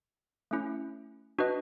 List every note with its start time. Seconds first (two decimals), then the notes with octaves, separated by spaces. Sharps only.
0.51 A3 C#4 E4
1.39 D4 F#4 B4 D#5